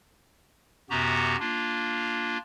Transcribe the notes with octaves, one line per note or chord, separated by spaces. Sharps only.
F#2 C3 B3 F#4 G4 A#5
A#3 D4 F4